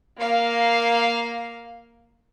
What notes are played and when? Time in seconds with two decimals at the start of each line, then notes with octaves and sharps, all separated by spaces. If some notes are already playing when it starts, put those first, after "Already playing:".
0.19 A#3 F5